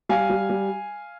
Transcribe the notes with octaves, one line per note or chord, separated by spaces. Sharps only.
G3 F5 G#5
G3
G3